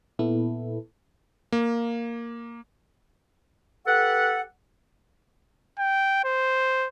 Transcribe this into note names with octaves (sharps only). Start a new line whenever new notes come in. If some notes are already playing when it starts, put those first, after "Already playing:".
A#2 B3 E4 A4
A#3
G4 A4 B4 F#5
G5
C5